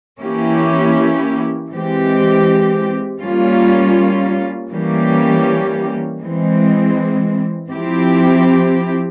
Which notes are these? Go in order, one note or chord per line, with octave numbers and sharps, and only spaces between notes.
E3 A#3 C#4 E4 G4
E3 G#3 C4 G4
G3 A#3 C#4 F4
E3 G3 A#3 C#4 G4
E3 G#3 C4
F3 C4 E4 G4